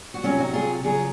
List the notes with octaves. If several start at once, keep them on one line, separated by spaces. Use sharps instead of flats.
F#4
C3 F#3 C#4 F4
D#4 F#4
F4 G#4
C#3 F#3 F4 G#4